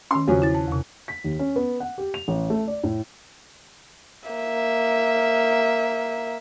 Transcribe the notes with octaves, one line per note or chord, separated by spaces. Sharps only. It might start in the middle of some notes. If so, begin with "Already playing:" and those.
D#3 C#4 C6
E2 C#3 F3 F#3 C#4
E4 A6
A5
E2 C3
B6
D#2
C#4
B3
F#5
G4
F7
A1
A3
D5
A2
A#3 E5